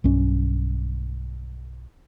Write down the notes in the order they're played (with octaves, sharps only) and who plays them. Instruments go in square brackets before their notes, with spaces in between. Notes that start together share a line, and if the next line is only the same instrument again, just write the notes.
[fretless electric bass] B1 G2 C#4